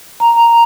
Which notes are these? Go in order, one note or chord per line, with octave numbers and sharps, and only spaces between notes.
A#5